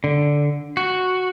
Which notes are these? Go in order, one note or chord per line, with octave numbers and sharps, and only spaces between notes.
D3
F#4